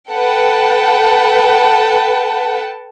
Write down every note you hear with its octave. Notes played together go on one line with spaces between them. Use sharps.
A4 B4 F#5 G5 A5